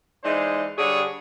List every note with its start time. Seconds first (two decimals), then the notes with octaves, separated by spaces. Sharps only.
0.24 E3 G#3 D4 D#4 C5
0.78 D3 G3 D4 G#4 C#5